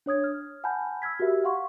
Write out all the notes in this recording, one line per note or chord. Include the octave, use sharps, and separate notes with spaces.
D4 C#5 D#6 G#6
F6
F#5 G#5 A5 B5 G6
E6 F6 G#6 B6
F#4 G4 A#4 E5
F5 F#5 C6 C#6